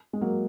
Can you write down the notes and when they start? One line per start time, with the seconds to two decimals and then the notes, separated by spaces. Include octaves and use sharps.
0.13 G#3
0.21 F#3 A#3